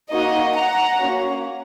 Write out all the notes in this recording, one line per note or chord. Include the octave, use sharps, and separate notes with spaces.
A#3 D#4 F#4 D#5
F#5 A#5
A#3 C#4 F#4